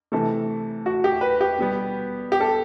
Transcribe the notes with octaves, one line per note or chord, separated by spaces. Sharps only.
C3 E3 A3 A4
F#4
G4
B4
G4
B2 G3 B3
G4
A4